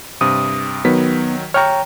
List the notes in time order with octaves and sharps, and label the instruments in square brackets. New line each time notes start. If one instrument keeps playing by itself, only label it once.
[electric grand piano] G2 C3 [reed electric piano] D#6
[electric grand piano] D#3 F#3 B6 [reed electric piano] B3
[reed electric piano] C#5 G5 A#5 [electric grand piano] C#6 F6